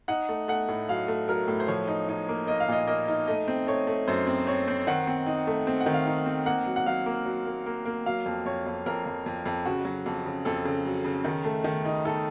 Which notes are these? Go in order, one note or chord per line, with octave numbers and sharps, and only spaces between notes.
D#4 F#5
A3
A3 F#5
A2
F#3 F5
A3
F#3 A#4
A2
C5
F3 C#5
D#4
D#4
A#3
A#3 D#5
F5
A#2 D#5
A#3 D#5
D#4
A3 D#5
C4
A3 C#5
A3
F#2 C5
C4
C4 C#5
C4
D#3 F#5
C4
D#4
A3
C4
F#5
D#3
F5
D#4
C4
A#3 F#5
F#3
F#5
F#3 F5
A#3
F#3
A#3
A#3
A#3
F#3 F5
F2
F2 C#5
F2
F2 A#4
F2
F2
F2
C#3 F#4
F#3
F2
C#3
F2 A4
C#3
F#3
C#3
D#3
A3
D#3
D#4
D#4 A4